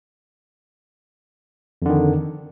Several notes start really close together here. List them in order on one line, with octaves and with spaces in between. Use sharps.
F2 D3 D#3